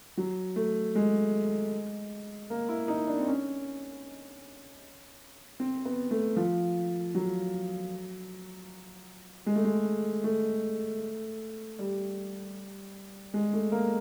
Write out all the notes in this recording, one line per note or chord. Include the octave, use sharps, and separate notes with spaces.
F#3
A3
G#3
A#3
E4
D#4
D4
C4
C#4
C4
B3
A3
F3
F#3
G#3
A3
G#3
A3
G3
G#3
A3
A#3